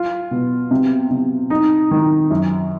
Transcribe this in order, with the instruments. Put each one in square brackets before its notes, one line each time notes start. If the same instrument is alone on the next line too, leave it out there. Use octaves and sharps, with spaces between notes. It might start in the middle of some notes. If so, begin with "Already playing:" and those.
Already playing: [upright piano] F4
B2
C3
C3
D#4
D#3
F#2